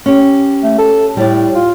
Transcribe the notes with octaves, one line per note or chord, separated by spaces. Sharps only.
C#4 G4
A3
A4
A2 G3 D5
F4